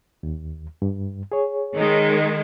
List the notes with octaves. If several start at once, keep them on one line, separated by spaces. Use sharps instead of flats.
D#2
G2
G#4 C#5
D#3 G#3